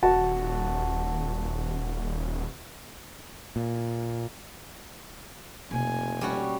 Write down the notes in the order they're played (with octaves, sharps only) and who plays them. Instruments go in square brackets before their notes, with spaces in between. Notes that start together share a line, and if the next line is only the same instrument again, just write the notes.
[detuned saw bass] D#1 [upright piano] F#4 A5
[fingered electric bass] A#2
[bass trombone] F1 [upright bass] B2 A#3 [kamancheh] G#5
[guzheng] G3 C#4 F#4